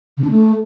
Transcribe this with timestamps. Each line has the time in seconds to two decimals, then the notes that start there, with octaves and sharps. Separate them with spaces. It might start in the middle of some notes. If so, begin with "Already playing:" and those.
0.17 C#3
0.24 D4
0.31 A3